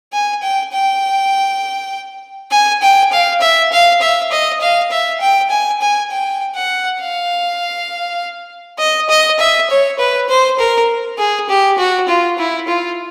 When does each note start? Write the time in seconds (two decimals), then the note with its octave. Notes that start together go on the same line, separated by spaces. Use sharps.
0.13 G#5
0.42 G5
0.72 G5
2.51 G#5
2.82 G5
3.12 F5
3.41 E5
3.71 F5
4.01 E5
4.31 D#5
4.61 F5
4.91 E5
5.21 G5
5.50 G#5
5.81 G#5
6.11 G5
6.55 F#5
7.00 F5
8.79 D#5
9.09 D#5
9.39 E5
9.69 C#5
9.99 B4
10.29 C5
10.58 A#4
11.18 G#4
11.49 G4
11.78 F#4
12.08 F4
12.38 E4
12.68 F4